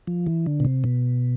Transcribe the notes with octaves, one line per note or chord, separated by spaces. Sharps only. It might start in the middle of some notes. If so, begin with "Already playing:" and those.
F3
E3
D3
B2
C3
B2